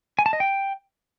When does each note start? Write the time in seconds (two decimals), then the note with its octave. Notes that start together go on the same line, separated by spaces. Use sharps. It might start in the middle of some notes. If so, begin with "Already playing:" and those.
0.19 G#5
0.26 A5
0.33 D#5
0.40 G5